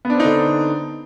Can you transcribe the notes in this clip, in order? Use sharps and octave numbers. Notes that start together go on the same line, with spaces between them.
D3 B3 C4 D4 D#4